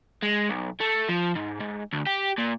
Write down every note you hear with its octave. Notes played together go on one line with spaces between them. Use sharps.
G#3
B1
A3
F3
G#2
G#2
D2
G4
A#2